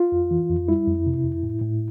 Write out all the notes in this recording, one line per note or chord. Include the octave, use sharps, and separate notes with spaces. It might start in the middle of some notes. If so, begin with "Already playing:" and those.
Already playing: F4
F2
E3
F2
G3 E4
F2
C3
F2
A2
A2